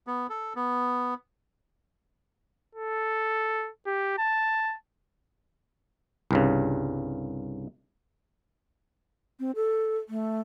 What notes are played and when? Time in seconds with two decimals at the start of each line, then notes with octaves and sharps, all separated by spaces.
0.07 B3
0.30 A4
0.56 B3
2.75 A4
3.86 G4
4.18 A5
6.31 C2 G2 C#3
9.40 C4
9.55 A4
10.09 A3